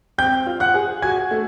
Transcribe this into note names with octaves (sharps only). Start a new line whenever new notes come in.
C4 G5 G6
F4
F#5 F#6
G#4
F#4 G#5 G#6
A3